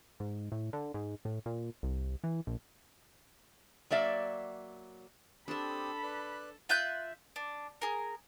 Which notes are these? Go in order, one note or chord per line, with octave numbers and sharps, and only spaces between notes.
G#2
A2
D3
G#2
A2
A#2
C2
E3
A#1
F#3 A#3 D5 E5
C4 D4 G4 A4 A5 B5 D#6
B4 D5 F#6
F4 E5 F#6 G6
D4
G#4 A#4